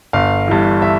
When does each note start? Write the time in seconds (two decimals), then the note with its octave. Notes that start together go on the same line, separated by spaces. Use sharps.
0.13 G1 F5
0.48 G2 E3
0.82 E5